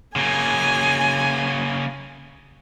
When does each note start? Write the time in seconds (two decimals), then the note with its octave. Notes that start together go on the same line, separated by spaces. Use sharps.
0.16 C#3 A#3 G#5